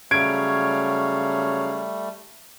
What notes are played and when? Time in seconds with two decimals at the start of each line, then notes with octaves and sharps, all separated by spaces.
0.11 C#3 F#3 G3 A3 C#5 F5 G#6 D7